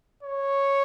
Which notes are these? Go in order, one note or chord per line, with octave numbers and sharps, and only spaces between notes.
C#5